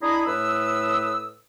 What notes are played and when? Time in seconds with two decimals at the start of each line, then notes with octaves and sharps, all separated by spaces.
0.02 D4 E4 G#4 D#5 A#5 B5
0.26 A2 B4 D#6 E6